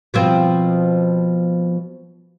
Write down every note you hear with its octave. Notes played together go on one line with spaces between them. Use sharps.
B2 F3 C4